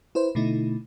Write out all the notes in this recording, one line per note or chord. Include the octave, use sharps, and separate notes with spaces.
E4 B4 C5
B2 D3 A3 D#4 E4